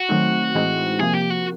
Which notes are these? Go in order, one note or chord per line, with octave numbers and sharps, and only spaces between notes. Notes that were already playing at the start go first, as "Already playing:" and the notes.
Already playing: F#4
D#3 F#3 A3 C4 D#4
A2 E3 G#3 C4 D#4
C3 F3 A#3 G#4
G4
F#4